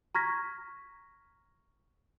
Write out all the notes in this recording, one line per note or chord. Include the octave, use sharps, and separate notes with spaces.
A#5 C#6 F6 G#6 A#6 B6